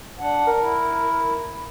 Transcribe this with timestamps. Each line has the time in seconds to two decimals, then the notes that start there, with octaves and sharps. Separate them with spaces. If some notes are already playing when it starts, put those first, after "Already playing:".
0.20 D4 F#5
0.47 A#4
0.61 E4